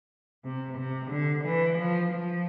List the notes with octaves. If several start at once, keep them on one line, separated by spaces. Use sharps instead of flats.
C3
C3
D3
E3
F3
F3